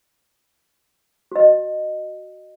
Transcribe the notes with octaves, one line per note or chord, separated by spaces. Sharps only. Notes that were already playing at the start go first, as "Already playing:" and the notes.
F#4 D#5